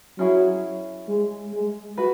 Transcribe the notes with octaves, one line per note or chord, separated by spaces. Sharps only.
F#3 C#4 E4 G#4
G#3
G#3
F#4 B4